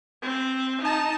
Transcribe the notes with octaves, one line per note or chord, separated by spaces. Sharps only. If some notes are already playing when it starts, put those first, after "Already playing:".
C4
D#4 A5